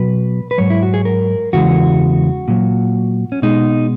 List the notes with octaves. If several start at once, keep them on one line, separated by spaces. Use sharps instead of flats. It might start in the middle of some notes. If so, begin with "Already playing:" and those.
Already playing: B2 F#3 B4
B4
G#2 F#3 C#5
E4
F#4
G#4
A#4
E2 C#3 E3 G#3 F#4
A#2 F#3
C#4
B2 G#3 D#4